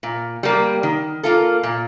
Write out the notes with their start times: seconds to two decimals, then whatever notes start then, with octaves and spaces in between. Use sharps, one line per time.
0.03 A#2
0.43 G3 A#3
0.83 D#3
1.23 A#3 F4 A4
1.63 A#2